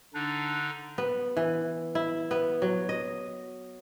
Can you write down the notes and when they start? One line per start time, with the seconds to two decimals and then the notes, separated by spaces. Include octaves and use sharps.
0.14 D3 D4 D#4
0.98 B3
1.37 E3
1.95 E4
2.31 B3
2.62 F#3
2.89 D#5